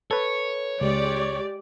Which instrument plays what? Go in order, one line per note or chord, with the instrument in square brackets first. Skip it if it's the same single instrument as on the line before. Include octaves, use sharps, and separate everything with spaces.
[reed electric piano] A4 B4 [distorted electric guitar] C#5
[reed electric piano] C#2 [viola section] G#3 G4 D5